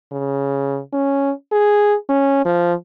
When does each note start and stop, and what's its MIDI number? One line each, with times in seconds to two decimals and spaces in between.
0.12 0.79 49
0.93 1.31 61
1.52 1.95 68
2.09 2.43 61
2.46 2.73 53